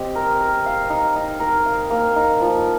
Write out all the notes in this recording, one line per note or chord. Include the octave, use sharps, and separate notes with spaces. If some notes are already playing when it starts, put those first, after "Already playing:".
Already playing: C4 G4 D#5
A#4
A#4
F5
D#4
D#4
A#4
F5
A#3
D#4
F3